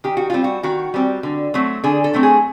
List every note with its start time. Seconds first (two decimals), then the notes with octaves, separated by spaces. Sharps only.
0.04 D#3 G4
0.17 F#4
0.30 G3 C4 F4
0.44 F#4
0.63 D#3 F#4
0.94 G3 C4
1.23 D3
1.54 F#3 A3 C4
1.84 D3 G#4
2.04 A4
2.13 F#3 A3 C4
2.23 G#4